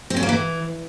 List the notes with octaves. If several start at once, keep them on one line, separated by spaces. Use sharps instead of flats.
C4
C#4
A#3
E3